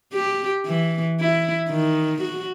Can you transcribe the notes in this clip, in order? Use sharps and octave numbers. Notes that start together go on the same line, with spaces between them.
G4
E3
E4
D#3
F#4